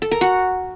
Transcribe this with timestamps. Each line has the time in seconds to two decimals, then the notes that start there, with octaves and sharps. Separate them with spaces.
0.02 A4
0.11 A#4
0.21 F#4